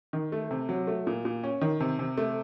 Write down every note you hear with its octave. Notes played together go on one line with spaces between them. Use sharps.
D#3
A3
C3
F#3
A3
A#2
A#2
C#4
D#3
C3
C3
A3